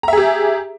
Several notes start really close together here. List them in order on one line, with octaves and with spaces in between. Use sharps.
A#5 E5 G#4 G4